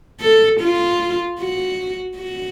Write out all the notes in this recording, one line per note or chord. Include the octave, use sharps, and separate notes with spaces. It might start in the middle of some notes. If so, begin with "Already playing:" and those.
A4
F4
F#4
F#4